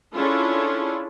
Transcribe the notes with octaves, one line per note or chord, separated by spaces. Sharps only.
C#4 D4 E4 F4 G#4 A4